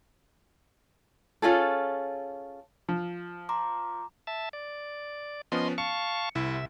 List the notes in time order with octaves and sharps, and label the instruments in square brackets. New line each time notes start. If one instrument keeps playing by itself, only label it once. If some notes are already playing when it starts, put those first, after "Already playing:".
[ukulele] C#4 F4 G#4 A4
[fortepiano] F3
[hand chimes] A#5 C6 D6
[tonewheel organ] E5 A5
D5
[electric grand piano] F3 B3 C#4 [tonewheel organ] D#5 C6
[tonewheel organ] F5 A5 C#6 [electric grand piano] C#7
[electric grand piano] C2 E4 [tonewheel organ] C3 E5